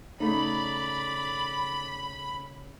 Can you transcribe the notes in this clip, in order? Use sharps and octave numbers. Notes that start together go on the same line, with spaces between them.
C#3 A3 D#4 D5 B5